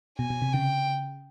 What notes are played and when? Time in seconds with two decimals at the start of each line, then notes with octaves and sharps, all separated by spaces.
0.18 B2 G#5
0.30 B2
0.42 C3
0.53 C#3 G5